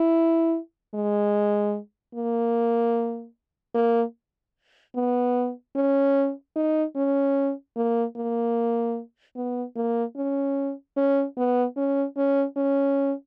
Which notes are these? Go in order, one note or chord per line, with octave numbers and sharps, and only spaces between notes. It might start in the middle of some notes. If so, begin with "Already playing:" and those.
Already playing: E4
G#3
A#3
A#3
B3
C#4
D#4
C#4
A#3
A#3
B3
A#3
C#4
C#4
B3
C#4
C#4
C#4